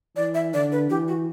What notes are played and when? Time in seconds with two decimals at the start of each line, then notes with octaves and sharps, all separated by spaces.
0.16 E3 D5
0.34 E5
0.54 D3 D5
0.72 B4
0.90 E3 G4
1.08 F#4